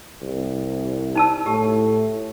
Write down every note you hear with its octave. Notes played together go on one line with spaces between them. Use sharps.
C2
D#4 A5 E6
A2 G4